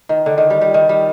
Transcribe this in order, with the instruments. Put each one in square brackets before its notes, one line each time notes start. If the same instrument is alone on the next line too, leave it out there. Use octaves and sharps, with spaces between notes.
[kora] D#3
D3
D#3
G3
G3
D#3
G3